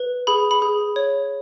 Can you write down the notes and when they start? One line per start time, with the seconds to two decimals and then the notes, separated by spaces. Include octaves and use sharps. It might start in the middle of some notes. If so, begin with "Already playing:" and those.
Already playing: B4
0.27 G#4 B5
0.51 B5
0.62 G#4
0.96 C#5